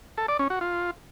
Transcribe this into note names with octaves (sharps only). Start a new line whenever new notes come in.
A4
D5
C#4
F#4
F4